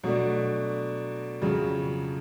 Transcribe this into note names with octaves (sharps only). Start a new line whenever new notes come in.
B2 F#3 A3 D4
F2 C#3 F#3